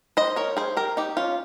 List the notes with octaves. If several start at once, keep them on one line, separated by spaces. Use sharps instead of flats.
C5 D#5
A#4 C#5
G#4 C5
G4 A#4
D#4 G4
C#4 F4